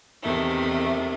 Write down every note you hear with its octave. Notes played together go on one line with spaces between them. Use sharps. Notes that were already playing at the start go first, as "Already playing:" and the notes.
E2 C3 D#3 A3